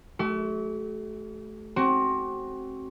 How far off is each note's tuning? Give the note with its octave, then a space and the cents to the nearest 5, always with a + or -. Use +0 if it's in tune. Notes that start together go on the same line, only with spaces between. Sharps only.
A3 -30 F#4 +45
C4 +25 F#4 +30